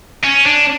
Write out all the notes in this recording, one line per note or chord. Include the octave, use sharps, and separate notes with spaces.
C#4
D4